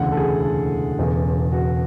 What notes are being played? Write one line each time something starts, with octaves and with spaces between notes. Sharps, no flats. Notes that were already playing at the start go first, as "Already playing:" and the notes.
Already playing: E1 D2 C#3 E3 F#5
A4
G#4
A4
E1 E2 C#3
F#4